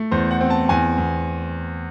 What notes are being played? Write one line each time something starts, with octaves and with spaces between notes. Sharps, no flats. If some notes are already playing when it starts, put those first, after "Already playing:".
Already playing: A3
E2 C5
F#5
C4
A5
E2 G#5
E2